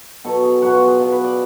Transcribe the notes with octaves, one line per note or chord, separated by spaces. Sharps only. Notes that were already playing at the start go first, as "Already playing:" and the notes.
B2 F#3 A4
G#4
B2 F#3 F#4
F4
G#4
B2 F#3
B4
D5